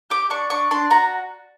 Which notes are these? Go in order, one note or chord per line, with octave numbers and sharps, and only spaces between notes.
G4 D6
D4 C#6
D4 C#6
D4 C6
F#4 A#5